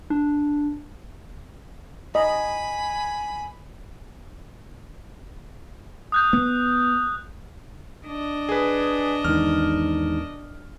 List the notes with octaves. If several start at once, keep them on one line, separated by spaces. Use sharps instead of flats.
D4
D#5 G#5 B5
D#6 F#6 G6
B3
D4 D#5
G#4 B4
E2 G#2 D#3 F6